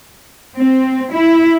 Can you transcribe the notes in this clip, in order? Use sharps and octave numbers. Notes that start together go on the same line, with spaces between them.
C4
E4